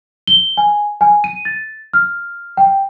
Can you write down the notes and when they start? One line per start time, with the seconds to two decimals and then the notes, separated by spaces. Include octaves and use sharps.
0.27 G7
0.57 G#5
1.01 G#5
1.24 D#7
1.45 A6
1.93 F6
2.57 G5